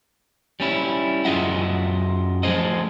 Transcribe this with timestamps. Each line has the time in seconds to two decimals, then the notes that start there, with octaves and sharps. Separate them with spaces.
0.60 G3 C#4 E4
1.25 F#2 F4 G#4 D#5 E5 F#5
2.43 F3 A3 G#4 C5 D#5